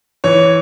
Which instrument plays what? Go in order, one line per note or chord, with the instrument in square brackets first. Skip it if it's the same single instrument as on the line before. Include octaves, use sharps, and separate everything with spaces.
[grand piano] E3 C#5